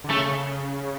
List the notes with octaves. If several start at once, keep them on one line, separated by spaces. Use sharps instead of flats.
D3
C#3 A3